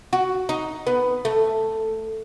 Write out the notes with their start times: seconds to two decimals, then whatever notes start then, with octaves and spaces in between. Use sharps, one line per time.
0.13 F#4
0.49 D#4
0.87 B3
1.25 A3